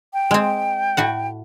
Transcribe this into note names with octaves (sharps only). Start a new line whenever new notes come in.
G5
G#3 C4
A2 F#4 F#5